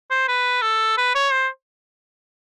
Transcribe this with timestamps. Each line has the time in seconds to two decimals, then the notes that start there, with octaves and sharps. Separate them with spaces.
0.11 C5
0.28 B4
0.62 A4
0.97 B4
1.15 C#5
1.32 C5